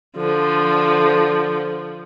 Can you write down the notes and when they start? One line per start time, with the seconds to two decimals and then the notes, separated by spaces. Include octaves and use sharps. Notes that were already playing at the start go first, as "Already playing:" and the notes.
0.17 D3 F3